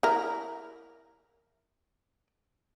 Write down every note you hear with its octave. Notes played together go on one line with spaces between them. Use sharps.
E4 A#4